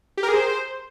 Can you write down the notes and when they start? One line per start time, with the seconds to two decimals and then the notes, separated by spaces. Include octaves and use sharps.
0.17 G4
0.23 A#4
0.28 G#4
0.34 C5